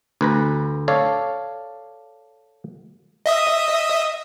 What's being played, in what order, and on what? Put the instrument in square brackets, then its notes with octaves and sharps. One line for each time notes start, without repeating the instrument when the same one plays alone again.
[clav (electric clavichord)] D2 B4 A#5
A4 C#5 D5 F5
[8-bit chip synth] D#5 E5 D#6